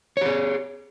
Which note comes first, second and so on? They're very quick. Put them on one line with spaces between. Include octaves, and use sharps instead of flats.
C#5 G4 G#4